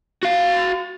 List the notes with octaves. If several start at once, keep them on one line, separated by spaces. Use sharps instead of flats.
F#4 F5